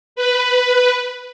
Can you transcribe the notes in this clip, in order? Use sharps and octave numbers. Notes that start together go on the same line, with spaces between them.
B4